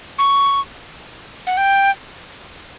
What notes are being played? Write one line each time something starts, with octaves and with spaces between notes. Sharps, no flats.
C#6
F#5
G5